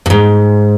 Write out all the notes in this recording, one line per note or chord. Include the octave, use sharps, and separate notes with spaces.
G2
G#2